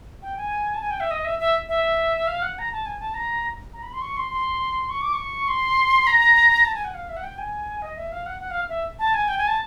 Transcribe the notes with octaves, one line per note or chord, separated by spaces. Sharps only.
G5
G#5
A5
G#5
G5
E5
D#5
E5
E5
E5
F5
F#5
A#5
A5
G#5
A5
A#5
A#5
B5
C6
C#6
C6
C6
C#6
D6
C#6
C6
A#5
A5
G#5
F#5
F5
E5
F#5
G5
G#5
D#5
E5
F5
F#5
F#5
F5
E5
A5
G#5
G5
G#5
A5